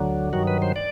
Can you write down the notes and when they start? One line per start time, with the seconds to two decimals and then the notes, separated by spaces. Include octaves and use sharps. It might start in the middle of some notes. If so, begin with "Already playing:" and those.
Already playing: D2 D3 F#3
0.33 G2 D#3 F#3 F#4
0.47 B4
0.62 C5
0.76 D5